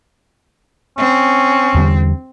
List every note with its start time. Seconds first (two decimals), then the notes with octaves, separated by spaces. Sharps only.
0.98 C4 C#4
1.75 E2 D3 G3